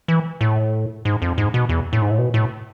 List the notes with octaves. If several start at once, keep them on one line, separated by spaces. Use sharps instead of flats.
E3
A2
G#2
F2
G#2
B2
E2
A2
G#2
A2
B2
A2